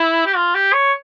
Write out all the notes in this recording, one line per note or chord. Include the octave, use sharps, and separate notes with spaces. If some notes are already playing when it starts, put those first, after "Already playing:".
Already playing: E4
G4
F4
G4
C#5